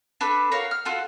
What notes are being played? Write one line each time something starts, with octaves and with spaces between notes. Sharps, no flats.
D4 A4 B4 B5
F#4 A#4 C#5 F5
F6
F4 F#4 A4